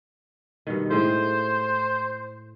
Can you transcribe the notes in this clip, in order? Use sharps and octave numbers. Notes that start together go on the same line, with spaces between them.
G2 B2 D#3
A2 G#3 C5 G5